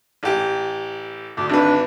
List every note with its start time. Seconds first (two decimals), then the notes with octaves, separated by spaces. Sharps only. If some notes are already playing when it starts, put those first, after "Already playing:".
0.23 A1 G4
1.37 D2 D6
1.49 G#1 D4 B4